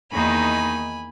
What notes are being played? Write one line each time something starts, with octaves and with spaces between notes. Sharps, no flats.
E2 D#3 A#3 D#4 G#5 B5